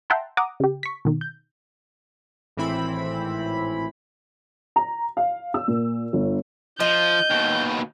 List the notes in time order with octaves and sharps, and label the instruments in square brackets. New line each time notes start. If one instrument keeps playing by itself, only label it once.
[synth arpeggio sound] E5 F#5 G5 A5 A#5 C6
F#5 A#5 D6 D#6
C#3 G4
C#6 B6
B2 D#3
G6
[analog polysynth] G#1 A2 E3 C4 E4 B5
[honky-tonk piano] A#5
F5
E6
A#2
G1
[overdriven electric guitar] F3 [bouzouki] D#5 [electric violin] G6
[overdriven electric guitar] D#2 B2